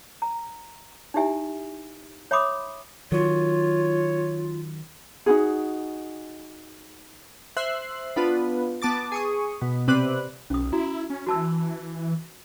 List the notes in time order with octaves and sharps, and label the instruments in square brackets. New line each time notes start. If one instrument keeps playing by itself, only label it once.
[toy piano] A#5
D#4 E4 G4 E5 G#5
C#5 E5 B5 C6 D6 D#6
[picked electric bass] D#3 F#3 [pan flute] F4 [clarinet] C#5
[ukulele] D#4 F4 F#4 G#4
[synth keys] C5 E5 F#6 C7
B3 D4 F4 B4
B3 A5 D6 A6
G#4 C#6 D#6
B2
C3 C4 B4 D5 F#6
[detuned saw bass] B1 [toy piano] C#4 D#6
[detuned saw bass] E4 [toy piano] F#4 A#5
[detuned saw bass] C#4
[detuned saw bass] E3 [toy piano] F#4 A5 E6